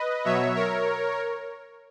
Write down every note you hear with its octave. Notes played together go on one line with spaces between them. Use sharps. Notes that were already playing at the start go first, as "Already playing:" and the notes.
Already playing: B4 D#5
B2 F#3 C#5 E5
A#4 C#5